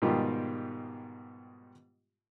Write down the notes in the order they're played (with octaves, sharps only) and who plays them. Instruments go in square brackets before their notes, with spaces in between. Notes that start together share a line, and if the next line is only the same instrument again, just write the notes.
[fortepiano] G#2 B2 D#3 G3 F4 G4